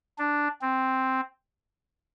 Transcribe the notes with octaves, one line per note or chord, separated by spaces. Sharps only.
D4
C4